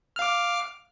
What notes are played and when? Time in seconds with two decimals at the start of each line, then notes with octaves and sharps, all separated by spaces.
0.16 F6
0.19 F5
0.22 D6